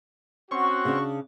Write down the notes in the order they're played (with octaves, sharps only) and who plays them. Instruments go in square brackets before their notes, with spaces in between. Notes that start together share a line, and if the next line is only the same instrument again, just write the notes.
[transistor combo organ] C4 C#4 [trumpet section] F#4 [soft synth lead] C#6
[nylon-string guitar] C#3 D4